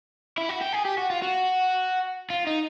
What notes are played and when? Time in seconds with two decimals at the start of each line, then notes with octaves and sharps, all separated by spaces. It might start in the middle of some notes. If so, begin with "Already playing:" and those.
0.38 E4
0.49 F#4
0.61 G4
0.73 G#4
0.85 G4
0.98 F#4
1.10 F4
1.22 F#4
2.30 F4
2.47 D#4